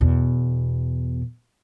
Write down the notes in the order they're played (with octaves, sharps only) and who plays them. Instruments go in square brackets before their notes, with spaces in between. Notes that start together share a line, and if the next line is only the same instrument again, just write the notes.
[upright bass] E2 B2